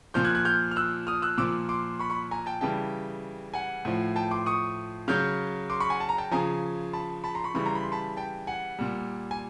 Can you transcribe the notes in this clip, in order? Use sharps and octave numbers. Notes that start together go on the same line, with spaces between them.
A#2 F3 F6 G6
F#6 G#6
F#6 G#6
F6 G6
F6
E6 F#6
D#6 F6
E6 F#6
A#2 F3 D6 E6
C6 D6
B5 C#6
B5 C#6
G#5 A#5
G5 A5
C#3 E3 G3 G5 A5
F#5 G#5
A2 F3
G5 A5
C6 D6
C#6 D#6
C#3 F#3 F6 G6
C6 D6
B5 C#6
F#5 G#5
A5
A#5
G5 A5
C#3 F3 G#5 A#5
A5 B5
A5 B5
A#5 C6
B5 C#6
C#3 E3 G3 B5 C#6
A#5 C6
B5
C6
A5 B5
G5 A5
F#5 G#5
A#2 G3
G#5